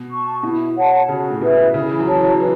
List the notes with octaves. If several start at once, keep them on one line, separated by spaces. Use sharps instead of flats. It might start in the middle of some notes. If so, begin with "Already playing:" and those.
Already playing: B2
A5 C#6
B2 E4
C#5 F#5 A5
C#3 F#4
A2
B2 B4 E5
C#3 E4
E3
F#3
E3 C#5 A5
F#3
E3 B4